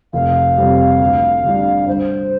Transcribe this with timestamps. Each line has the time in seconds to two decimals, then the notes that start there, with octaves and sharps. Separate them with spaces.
0.13 F1 F5
0.57 F2 C3 G3
1.00 D2
1.44 D3 G3 D4
1.87 G2 C5